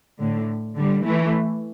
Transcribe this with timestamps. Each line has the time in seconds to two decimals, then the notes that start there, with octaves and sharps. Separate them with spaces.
0.20 A2 D3
0.76 D3 G3
1.05 E3 A3